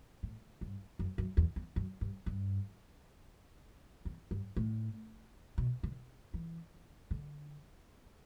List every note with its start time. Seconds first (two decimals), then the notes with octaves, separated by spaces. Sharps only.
0.23 A2
0.61 G2
0.99 F#2
1.18 F#2
1.37 E2
1.56 E2
1.76 F#2
2.01 G2
2.26 G2
4.05 E2
4.31 G2
4.57 A2
5.58 B2
5.83 D3
6.34 E3
7.11 D3